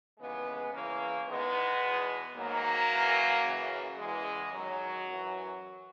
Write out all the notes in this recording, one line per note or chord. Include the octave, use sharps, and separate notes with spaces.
D#2 C#3 E3 G#3 B3
E2 C#3 E3 A#3 C#4
E2 D#3 G#3 B3
E2 B2
G#2 D#3 F#3 A#3
F#2 E3
F#2 C#3 E3
E2 C#3 E3 G#3
F#2 D#3 F#3
F#2 E3